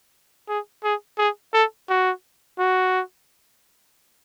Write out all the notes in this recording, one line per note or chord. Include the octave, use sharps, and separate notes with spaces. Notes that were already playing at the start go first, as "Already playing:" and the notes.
G#4
G#4
G#4
A4
F#4
F#4